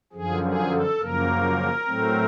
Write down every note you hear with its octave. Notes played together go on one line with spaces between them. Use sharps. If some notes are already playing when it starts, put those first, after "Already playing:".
F#2 D3 F3 G#4
G#4
A4
F#2 C#3 F3 A#3 A#4
A2 F#3 A3 C4